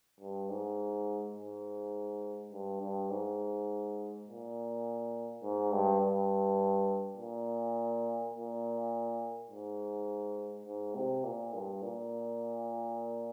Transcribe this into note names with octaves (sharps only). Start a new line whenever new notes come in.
G2
G#2
G#2
G2
G2
G#2
A#2
G#2
G2
G2
A#2
A#2
G#2
G#2
C3
A#2
G2
A#2